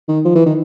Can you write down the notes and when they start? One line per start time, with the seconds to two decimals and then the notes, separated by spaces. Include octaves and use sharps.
0.08 D#3
0.25 F3
0.35 E3
0.46 D#3